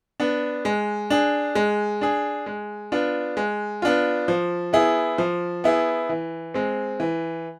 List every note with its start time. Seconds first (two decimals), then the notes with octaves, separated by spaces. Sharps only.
0.20 B3 D4
0.65 G#3
1.10 D4 G#4
1.55 G#3
2.01 D4 G#4
2.46 G#3
2.92 B3 D4 F4
3.37 G#3
3.82 B3 D4 F4
4.28 F3
4.73 B3 E4 G#4
5.18 F3
5.64 B3 E4 G#4
6.09 E3
6.54 G#3 C4
7.00 E3